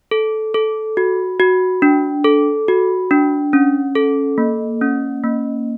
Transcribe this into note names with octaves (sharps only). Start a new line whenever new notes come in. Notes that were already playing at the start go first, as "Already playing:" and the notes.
A4
A4
F#4
F#4
D4
A4
F#4
D4
C#4
A4
A#3
C#4
A#3